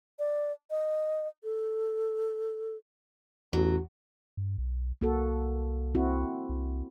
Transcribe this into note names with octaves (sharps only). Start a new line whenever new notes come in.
D5
D#5
A4
A1 E2 F#3
G2
B1
C2 A#3 F#4 A4
C4 E4 F#4
C2